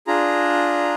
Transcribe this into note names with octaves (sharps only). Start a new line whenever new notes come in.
D4 F4 G#4 A#5